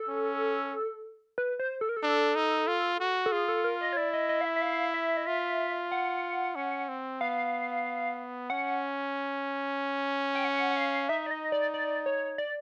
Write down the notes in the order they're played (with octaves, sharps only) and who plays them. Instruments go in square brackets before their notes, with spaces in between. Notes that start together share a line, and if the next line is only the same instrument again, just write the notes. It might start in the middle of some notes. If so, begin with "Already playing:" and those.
Already playing: [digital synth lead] A4
[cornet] C#4
[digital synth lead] B4
C5
A4
A#4
A4
[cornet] D4
D#4
F4
F#4
[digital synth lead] A4
[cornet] F4 [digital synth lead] G#4
[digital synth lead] A4
A#4
D#5
C#5
[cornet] E4 [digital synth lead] D5
[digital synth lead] D#5
D#5
F5
E5
E5
F5
E5
D#5
[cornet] F4 [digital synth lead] E5
[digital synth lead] F#5
[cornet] C#4
C4
[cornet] B3 [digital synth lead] F5
[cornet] C#4 [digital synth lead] F#5
[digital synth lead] G5
F#5
F#5
F5
[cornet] D#4 [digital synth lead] E5
[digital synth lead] D5
D#5
D5
D5
C#5
D5